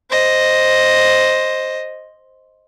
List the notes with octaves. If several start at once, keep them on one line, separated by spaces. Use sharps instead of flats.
C5 D#5